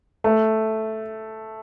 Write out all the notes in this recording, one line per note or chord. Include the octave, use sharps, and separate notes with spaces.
A3